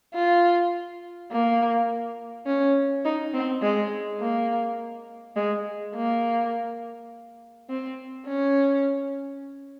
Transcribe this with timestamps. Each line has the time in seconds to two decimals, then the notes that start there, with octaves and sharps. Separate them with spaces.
0.14 F4
1.31 A#3
2.47 C#4
3.05 D#4
3.34 C4
3.62 G#3
4.20 A#3
5.36 G#3
5.95 A#3
7.69 C4
8.26 C#4